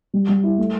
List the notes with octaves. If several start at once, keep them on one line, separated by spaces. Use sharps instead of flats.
G3
G3
E4
A3